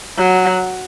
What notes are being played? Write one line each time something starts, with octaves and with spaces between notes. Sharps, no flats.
F#3